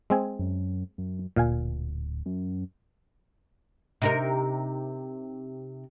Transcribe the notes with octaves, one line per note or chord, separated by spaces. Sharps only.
G#3 C4 G#5
F#2
F#2
D1 A#2 F5 G#5
F#2
C3 D#4 A#4